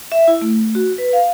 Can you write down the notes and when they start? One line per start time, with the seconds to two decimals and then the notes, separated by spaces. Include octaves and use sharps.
0.12 E5
0.28 E4
0.41 A3
0.75 F#4
0.98 B4
1.13 F5